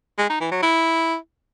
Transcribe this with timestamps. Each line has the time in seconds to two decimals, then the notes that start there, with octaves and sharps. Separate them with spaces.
0.18 G#3
0.29 D#4
0.40 E3
0.52 F#3
0.63 E4